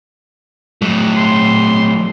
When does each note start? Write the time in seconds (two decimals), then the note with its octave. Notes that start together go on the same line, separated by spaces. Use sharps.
0.82 F#3 A3
1.17 C6